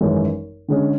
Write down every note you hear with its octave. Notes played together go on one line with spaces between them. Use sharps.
G#1 F#2 E3 G#3 C#4
D3 G#3 C#4 G#4